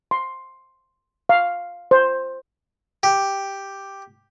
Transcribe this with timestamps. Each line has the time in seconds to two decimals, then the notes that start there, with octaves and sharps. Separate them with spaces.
0.11 C6
1.29 F5
1.91 C5
3.03 G4